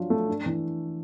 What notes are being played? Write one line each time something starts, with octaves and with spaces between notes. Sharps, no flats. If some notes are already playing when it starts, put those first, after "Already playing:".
Already playing: F3 F#3 D4 F4
A3
D4
E3